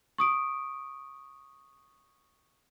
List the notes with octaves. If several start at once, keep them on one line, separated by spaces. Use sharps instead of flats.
C#6 D#6 D7